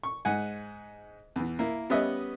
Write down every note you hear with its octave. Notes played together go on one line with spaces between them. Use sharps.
C#6
G#2 F#5 G#5
E2 E3
A#3 E4
G3 B3 C#4 B4 D#5 E5